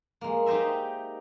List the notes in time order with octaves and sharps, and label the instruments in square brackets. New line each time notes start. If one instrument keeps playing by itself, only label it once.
[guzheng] G#3 A#3
D#4 G4 C5 D#5 E5